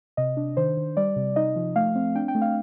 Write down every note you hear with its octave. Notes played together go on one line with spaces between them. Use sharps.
C3 D#5
D4
D#3 C5
D#3
G3 D5
C3
D#4 D#5
F3
A3 F5
C4
D4 G5
G5
A3
F5